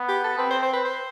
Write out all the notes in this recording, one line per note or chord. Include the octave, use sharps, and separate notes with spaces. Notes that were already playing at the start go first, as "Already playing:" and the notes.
Already playing: B3
G4
A4
C4 B4
C5
C5
B4
C5